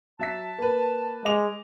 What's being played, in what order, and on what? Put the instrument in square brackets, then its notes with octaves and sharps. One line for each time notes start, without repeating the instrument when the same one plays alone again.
[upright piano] F#3 E5 B6 [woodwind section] A5
[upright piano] A#3 B4
[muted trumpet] G#3 [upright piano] D#5 D6 F7